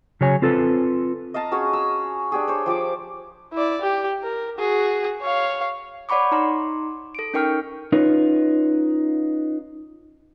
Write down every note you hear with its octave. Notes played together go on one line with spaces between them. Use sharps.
C#3 F#3 C#5 G#5
C4 F4 A4 B4
D#5 F5 A5 A#5
C#4 F#4 G#4 C#5
A#5 E6
D4 G4 G#4
C5 C#5
F3 G4 D5 D6
E4 D5
G4
A#4
F#4 G#4
C#5 F5
C#5 D5 F#5 B5 C#6 D6
D#4 A#5 C6
A4 D7
C#4 D#4 A#4 G5 C#6 F6
C#4 D#4 F4 B4 C#5